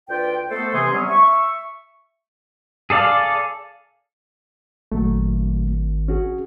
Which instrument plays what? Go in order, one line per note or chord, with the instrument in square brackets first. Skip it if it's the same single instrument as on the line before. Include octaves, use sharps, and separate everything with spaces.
[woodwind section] D2 F4 B4 D5 G5
A3 B3 A4 C5
C3 E3 G#4 C6
C3 F#3 G3 B3 C#4
E5 C#6
[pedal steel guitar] G#4 A4 D5 F5
[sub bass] G#1 [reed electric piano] A#2 F#3 A3
[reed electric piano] C#4 F#4 G#4